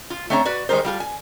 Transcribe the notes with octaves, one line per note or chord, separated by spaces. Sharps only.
F4
A3 C4 D4 C#5 D#5 A#5
F#4 B4 D5
D#3 G3 G#3 A#4 C5
G3 F4 A4
G#5